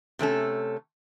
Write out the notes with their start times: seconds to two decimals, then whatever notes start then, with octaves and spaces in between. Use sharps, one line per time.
0.19 C3 A3 C#4 A4